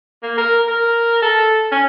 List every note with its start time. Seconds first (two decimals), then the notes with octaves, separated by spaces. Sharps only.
0.23 A#3
0.38 A#4
0.68 A#4
1.22 A4
1.72 C#4